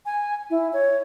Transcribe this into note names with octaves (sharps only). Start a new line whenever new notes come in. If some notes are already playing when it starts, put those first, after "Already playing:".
G#5
E4
C#5